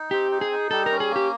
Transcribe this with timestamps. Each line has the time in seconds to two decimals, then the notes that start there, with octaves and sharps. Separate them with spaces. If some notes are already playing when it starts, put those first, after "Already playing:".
Already playing: D#4
0.11 C4 G4
0.31 D#4
0.41 G#4
0.52 D#4
0.71 G3 A4
0.86 A#4
0.91 C#4
1.00 G#4
1.11 A#3
1.16 G4